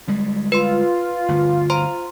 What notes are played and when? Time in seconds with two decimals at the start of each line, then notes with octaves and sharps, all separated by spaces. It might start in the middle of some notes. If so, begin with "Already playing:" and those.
0.07 D2 G3 G#3
0.52 F4 B4 C6
1.28 G1 D2
1.70 C5 A#5 C6